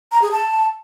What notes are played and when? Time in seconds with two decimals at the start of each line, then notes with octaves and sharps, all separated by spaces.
0.12 A#5
0.22 G#4
0.32 A5